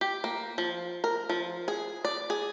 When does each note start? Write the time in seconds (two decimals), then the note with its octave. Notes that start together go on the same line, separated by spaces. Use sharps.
0.01 G4
0.24 A#3
0.58 F3
1.04 A#4
1.29 F3
1.68 G#4
2.05 D5
2.30 G#4